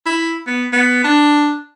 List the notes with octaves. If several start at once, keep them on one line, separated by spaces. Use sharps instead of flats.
E4
B3
B3
D4